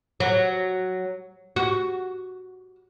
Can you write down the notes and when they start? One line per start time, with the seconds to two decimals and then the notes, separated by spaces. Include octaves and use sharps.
0.20 F#3
1.56 F#4